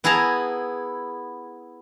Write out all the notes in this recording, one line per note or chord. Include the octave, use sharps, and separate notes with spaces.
B3 E4 G#4 A5 A#5